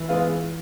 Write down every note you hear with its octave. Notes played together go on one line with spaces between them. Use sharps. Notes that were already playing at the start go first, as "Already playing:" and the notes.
Already playing: E3
G#3 B3 F4